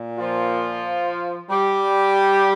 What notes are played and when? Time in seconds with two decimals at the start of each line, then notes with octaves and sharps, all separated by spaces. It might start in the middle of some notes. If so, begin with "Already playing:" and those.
Already playing: A#2
0.18 F3 F4
1.49 G3 G4